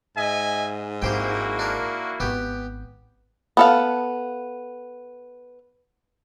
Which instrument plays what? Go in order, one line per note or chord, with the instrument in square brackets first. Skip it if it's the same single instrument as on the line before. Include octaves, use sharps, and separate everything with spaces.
[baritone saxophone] G#2 [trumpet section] D#5 E5 G#5
[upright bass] G#1 F3 [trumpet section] A#3 E4 F#4 [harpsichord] G4 C5 G5
[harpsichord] D4 A#4
[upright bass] G#1 [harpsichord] B3 G4
[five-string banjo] B3 A4 F5